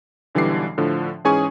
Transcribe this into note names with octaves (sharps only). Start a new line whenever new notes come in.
B1 D3 E3 G3 D6 C7
A2 D3 F3
G#2 E3 C#4 G#4 G#5 C#6